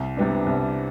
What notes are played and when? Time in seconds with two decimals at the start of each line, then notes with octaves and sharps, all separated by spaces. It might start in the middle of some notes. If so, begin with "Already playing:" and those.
Already playing: C2
0.17 C3 G3 B3 D4
0.46 C2